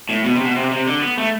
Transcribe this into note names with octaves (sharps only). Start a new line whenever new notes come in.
A2
B2
C3
B2
C3
C3
D3
B3
A3